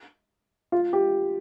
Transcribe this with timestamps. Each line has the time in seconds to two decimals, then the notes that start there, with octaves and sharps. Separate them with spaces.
0.72 F4
0.93 G4